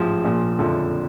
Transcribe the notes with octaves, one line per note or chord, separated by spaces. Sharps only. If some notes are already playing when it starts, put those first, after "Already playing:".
Already playing: A1 G#2 F3
A#1 A#2 F3
F#1 F2 D3 F3